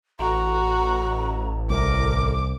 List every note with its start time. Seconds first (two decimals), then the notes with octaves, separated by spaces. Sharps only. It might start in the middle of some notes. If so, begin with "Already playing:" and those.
0.19 A1 F#4 A#5
1.70 C2 A#4 D6